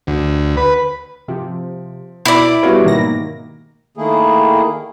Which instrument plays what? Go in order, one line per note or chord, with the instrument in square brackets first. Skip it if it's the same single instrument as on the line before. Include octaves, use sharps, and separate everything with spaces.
[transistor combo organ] D2
B4
[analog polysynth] C3 [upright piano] F3
[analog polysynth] B2 [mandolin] E4 D5
[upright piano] G3 B3 C#5 [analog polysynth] F4 F#4 G#4
[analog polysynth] G#2 B2 A#6 [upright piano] D#3 A#3
[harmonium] D#3 A3 A#3 E4 G#4